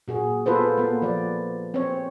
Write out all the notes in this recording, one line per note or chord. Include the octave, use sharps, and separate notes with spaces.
A#2 F#4 G#4
B3 F4 A4 B4 C5
A#3 B3
F3 D5
C4 C#5